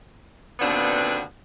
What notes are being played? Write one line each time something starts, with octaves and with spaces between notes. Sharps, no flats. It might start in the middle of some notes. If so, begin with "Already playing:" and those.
D#2 B2 D3 B3 C4 D4